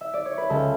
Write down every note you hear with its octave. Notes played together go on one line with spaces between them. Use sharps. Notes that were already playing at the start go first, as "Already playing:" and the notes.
E5
D5
C#5
B4
C#2 A4